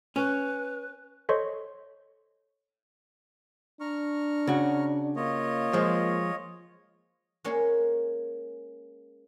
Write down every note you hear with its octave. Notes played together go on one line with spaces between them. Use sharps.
C#4 B4
A4 C5 C#5 D#5 C6 C#6
D4 A#5 C#6 F6
C#3 F#4
A#3 F4 C#5 D#5
F3 G#3
G#3 A#3 C#4 A#4 C#5